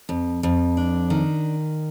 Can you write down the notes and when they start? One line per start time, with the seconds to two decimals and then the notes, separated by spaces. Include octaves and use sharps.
0.09 F2
0.43 F2
0.77 D4
1.10 D#3